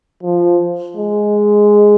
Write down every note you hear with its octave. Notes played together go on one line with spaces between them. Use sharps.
F3
G#3